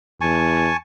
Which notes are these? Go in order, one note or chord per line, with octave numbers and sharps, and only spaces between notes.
E2 G#5 A5 C#6